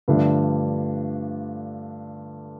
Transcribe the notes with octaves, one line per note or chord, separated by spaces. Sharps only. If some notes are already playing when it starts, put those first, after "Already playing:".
G2 D3 F3 A3 D4